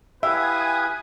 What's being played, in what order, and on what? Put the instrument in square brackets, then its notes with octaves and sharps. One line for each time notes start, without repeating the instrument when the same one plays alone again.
[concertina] E4 G4 F5 [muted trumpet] B4 [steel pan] E5 [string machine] G#5 D#6